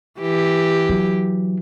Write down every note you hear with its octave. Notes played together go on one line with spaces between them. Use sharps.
E3 G4
F#3